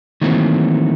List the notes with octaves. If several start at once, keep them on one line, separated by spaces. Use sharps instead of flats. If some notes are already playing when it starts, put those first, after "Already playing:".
D#3 E3 F#3 A3 A#3 C4